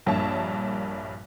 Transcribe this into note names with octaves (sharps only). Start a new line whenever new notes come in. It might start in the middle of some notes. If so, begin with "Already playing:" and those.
A#1 G2 A#3 C#5 E5 A5